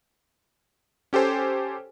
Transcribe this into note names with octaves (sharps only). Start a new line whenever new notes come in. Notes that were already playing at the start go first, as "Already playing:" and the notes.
C#4 G4 A4 C5 G#5